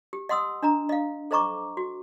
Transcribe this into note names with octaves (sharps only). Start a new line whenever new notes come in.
G4
D#5 F#5 C6 D#6 E6
D4 D#5 A#5
D#5 F5
A4 C5 D#5 A#5 C#6 D6
F#4